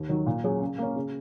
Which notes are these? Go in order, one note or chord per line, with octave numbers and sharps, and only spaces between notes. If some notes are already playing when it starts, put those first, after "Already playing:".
Already playing: D#2
D#3 F#3
A#2
F#3 C#4 G#4
C#3
A#3 C#4
C#3